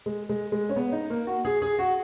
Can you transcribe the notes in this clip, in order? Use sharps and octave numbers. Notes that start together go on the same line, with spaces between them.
G#3
G#3
G#3
C#4
B3
D#4
A#3
F#4
G#4
G#4
F#4